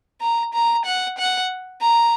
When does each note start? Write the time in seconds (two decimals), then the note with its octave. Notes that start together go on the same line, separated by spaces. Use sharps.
0.21 A#5
0.54 A#5
0.85 F#5
1.18 F#5
1.81 A#5